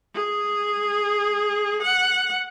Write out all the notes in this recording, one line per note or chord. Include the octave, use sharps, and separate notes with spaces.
G#4
F#5